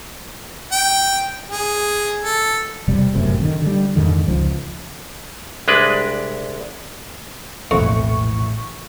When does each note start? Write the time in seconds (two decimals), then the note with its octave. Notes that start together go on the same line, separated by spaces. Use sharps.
0.72 G5
1.50 G#4
2.24 A4
2.88 E1 C3 G3
3.15 G1 F#2 A2 C3
3.41 D3 D#3
3.62 D3 G3
3.96 F2 G#2 D3 D#3
4.28 C#2 F3
5.68 C2 G#3 D4 B4
7.71 E1 A#1 F2 A2 E3 C#6